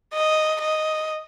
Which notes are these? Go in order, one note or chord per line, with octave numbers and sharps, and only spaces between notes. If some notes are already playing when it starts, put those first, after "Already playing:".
D#5
D#5